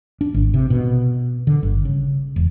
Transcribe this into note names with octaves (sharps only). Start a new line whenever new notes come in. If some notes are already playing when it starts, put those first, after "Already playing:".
D4
G#1
C3
B2
D3
G1
C#3
E1